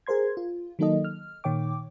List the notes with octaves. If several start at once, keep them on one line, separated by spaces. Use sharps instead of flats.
G#4 A#4 C5 C6 G#6
F4
D#3 F#3 A#3 D#4 A4 D#5
F6
A#2 D#3 C#5 G5 D6